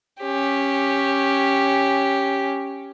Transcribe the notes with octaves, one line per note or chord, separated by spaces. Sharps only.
C#4 G4